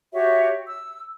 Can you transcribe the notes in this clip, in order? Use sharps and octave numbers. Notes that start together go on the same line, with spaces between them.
F#4 G4 C#5 E5
E6